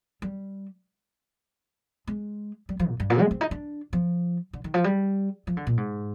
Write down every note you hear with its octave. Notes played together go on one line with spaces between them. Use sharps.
G3
G#3
G3
F3
A#2
G2
A#2
G#3
C4
D#4
D4
F3
D3
D#3
F3
G3
F3
D3
A#2
G#2